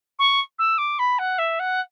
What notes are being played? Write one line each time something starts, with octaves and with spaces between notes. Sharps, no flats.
C#6
E6
D6
B5
F#5
E5
F#5